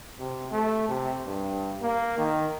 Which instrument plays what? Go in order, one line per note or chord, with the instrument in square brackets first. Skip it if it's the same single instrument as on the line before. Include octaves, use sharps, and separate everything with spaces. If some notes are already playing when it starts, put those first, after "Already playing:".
[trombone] C3
A3
C3
G2
A#3
D#3